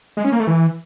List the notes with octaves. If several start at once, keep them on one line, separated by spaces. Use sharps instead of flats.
G#3
C#4
A#3
A3
E3